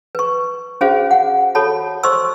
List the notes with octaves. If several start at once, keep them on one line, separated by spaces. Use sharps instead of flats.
B4 C#6
C#4 F#4 G#4 C5 F5
F#5
F#4 A4 C#5 A5 B5
C5 D#5 C6 C#6 E6